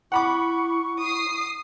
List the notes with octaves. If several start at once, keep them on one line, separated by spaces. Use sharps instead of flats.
E4 F#5 B5 C#6 D6
D#6 C7